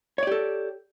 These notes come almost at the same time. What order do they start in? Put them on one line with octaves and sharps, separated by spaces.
C#5 D5 G4 A4